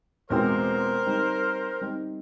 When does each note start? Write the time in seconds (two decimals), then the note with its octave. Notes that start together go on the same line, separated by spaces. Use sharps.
0.30 E2 B2 G#3 C4 F4 A#4 C5
1.06 G3 C4 D#4
1.81 G3 C4 D#4